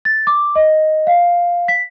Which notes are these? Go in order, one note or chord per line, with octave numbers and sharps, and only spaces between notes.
A6
D6
D#5
F5
B6